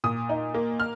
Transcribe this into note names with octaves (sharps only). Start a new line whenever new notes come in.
A#2 D#6
D#4
A#3
F6